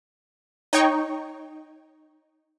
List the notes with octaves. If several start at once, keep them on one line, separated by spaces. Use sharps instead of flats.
D#4 C#5 G5 C#6